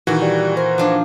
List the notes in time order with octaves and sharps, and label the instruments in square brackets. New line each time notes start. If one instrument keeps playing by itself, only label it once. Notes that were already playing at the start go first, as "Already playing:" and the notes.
[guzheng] A#2 D#3 [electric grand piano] E3 F#4
[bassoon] G3
[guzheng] A#4 [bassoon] C5
[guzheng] F3 D4